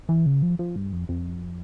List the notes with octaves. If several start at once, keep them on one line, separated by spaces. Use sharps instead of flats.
E3
C#3
F3
F3
G2
F2
F2